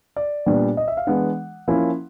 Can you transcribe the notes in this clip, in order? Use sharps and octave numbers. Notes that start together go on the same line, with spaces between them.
D5
A#2 G3 B3 D4
D#5
E5
F5
E3 G#3 B3 D4 F#5
F3 A#3 C#4 E4